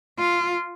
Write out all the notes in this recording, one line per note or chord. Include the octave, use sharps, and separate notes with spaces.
F4